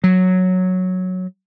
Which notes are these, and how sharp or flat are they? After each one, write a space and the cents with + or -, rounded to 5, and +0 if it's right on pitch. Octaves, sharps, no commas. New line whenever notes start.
F#3 -5